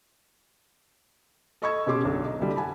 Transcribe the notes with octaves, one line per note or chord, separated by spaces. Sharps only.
A4 D#5 B5 C#6 E6 G#6
B2 C#4 G4 G#4 C6 D6
B1 D3
D#4
C2 D3 G3
F#5 G#5 A5 B5